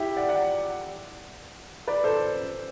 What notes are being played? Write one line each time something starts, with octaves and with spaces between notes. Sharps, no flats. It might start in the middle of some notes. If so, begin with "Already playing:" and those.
Already playing: E4 G4
D5 F#5
D5 F#5
B4 D5
A4 C5